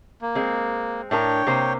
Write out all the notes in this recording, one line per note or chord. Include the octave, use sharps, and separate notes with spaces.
A#3
G#3 C4
A2 D4 A#4 C#5 G5
C3 A#3 C5